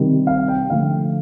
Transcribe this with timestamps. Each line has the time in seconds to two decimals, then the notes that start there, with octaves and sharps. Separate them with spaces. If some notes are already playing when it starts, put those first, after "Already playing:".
Already playing: C3 D#3 G3
0.27 F5
0.48 G5
0.70 D3 F3 A3 F5